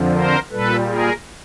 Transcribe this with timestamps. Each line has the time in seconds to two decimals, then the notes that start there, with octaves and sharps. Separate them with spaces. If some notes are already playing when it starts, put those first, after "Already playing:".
Already playing: F2 D3 F3
0.13 A#4 C5
0.51 A#2 G3 A4 B4
0.87 G#4 A#4